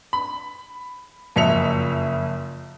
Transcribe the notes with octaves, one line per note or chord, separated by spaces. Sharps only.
B5
F#1 F2 E5 C#7 F7